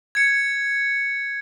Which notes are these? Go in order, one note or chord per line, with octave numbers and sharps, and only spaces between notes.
G#6 C#7